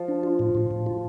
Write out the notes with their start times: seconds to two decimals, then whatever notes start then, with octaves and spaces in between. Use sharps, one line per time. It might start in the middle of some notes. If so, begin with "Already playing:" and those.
Already playing: F3
0.08 D4
0.23 F4
0.39 A2
0.55 A2
0.71 A2
0.86 F4